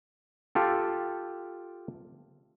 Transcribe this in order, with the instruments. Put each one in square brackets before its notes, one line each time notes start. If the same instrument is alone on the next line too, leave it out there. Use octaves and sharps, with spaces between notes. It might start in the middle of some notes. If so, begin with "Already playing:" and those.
[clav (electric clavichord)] F4 G4 A4